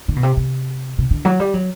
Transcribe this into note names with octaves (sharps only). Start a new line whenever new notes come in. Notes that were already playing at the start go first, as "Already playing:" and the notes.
D3
B2
C3
C3
C3
D3
F#3
G3
F#3